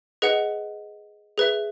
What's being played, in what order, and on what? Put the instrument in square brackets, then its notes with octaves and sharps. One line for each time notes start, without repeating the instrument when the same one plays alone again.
[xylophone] G#4 B4 D#5 F#5
G#4 B4 E5